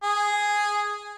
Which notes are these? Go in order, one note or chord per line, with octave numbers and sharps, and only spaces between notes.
G#4